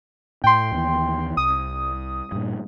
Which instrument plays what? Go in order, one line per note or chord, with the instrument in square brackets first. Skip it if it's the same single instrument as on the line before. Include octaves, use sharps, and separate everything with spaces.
[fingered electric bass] A2 [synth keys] G5 C6
[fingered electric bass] D#2 E3 B3
[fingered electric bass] C2 [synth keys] D#6
[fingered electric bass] G2 A#2